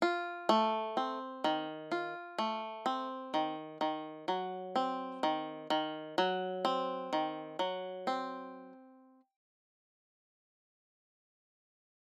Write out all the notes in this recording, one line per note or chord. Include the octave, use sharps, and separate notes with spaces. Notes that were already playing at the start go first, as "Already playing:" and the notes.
F4
A3
C4
D#3
F4
A3
C4
D#3
D#3
F#3
C4
D#3
D#3
F#3
C4
D#3
F#3
C4